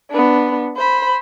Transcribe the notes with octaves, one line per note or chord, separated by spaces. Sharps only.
B3 D4
C5 B5